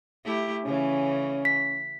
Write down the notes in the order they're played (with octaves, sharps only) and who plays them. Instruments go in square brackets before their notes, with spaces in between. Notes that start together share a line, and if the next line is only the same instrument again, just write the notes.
[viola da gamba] A3 E4 G4
[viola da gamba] C#3 E3 [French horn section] C#4
[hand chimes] B6